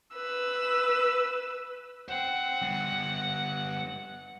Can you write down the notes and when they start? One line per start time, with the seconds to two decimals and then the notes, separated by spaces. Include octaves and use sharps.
0.15 B4 E6
2.08 C5 F#5 G5
2.62 G3 B3